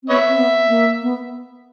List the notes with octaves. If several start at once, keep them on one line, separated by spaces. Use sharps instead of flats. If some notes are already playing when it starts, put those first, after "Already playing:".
C4
B3 B4 C#5 E5
C4
B3
A#3
B3